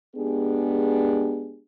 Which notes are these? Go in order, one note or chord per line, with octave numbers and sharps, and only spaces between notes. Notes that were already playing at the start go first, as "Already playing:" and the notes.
G#3 B3 D4 G4 G#4